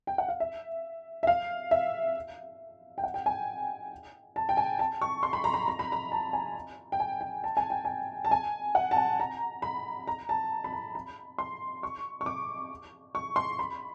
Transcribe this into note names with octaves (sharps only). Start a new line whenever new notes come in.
G5
F#5
F5
E5
E5
F5
E5
G5
F#5
G5
G#5
A5
G5
G#5
A5
C#6
C6
B5
A#5
B5
A#5
B5
A#5
A5
G#5
G5
G#5
G5
A5
G#5
G5
G#5
A5
G#5
F#5
A5
G#5
A#5
B5
A#5
A5
B5
A#5
B5
C6
C#6
C#6
D6
C#6
C6
B5